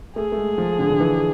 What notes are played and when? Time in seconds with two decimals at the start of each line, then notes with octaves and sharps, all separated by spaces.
0.16 A3 G#4
0.32 A3
0.37 G#3
0.58 F3
0.79 D3
0.90 D3
1.00 E3